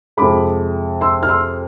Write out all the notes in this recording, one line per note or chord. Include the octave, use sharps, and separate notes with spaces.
F2 C3 G#3 B5 D6
C6 E6
F6
C6 E6